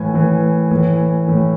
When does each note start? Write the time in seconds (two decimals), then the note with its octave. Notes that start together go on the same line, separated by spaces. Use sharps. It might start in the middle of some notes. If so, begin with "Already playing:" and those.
Already playing: A2 E3 G#5
0.14 A2 E3
0.71 A2 E3
1.28 A2 E3